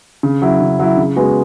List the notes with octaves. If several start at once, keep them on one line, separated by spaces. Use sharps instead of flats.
C#3
F#3 E4
C#3
F#3 E4
C#3
G#3 B3 F#4